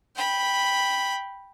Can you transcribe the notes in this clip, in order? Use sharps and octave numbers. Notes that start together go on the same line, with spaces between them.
G5 B5